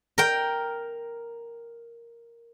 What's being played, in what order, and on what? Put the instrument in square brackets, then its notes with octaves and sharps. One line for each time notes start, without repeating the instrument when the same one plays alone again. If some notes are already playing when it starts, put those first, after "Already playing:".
[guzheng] A#4 G5